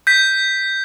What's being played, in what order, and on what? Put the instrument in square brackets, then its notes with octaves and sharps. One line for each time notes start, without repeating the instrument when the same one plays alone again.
[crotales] G6 B6